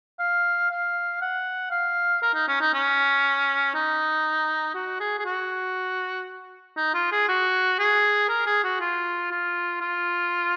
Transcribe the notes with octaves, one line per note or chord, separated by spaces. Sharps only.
F5
F5
F#5
F5
A#4
D#4
C#4
D#4
C#4
D#4
F#4
G#4
G#4
F#4
D#4
F4
G#4
F#4
G#4
A#4
G#4
F#4
F4
F4
F4